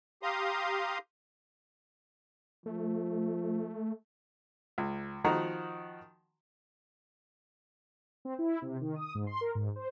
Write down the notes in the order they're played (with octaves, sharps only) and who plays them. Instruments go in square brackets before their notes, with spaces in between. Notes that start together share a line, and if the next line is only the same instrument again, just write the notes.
[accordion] G4 F5 A#5 C6 D#6
[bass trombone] F3 [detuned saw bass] A3
[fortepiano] C#2
D#3 F3 F#4 F#5 A#5
[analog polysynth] C4
E4
C3
D#3
D#6
G#2
C6
A#4
G#2
C5